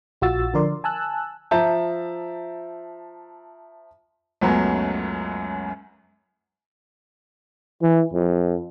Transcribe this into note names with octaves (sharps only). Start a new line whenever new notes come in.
A#1 F4 F#4 E6 A6
D3 F3 A#4 D5 C6
G#5 A5 E6 F#6
F3 E5 A5 A#5 G6
C#2 F#2 F#3 A3 B3 C#4
E3
F2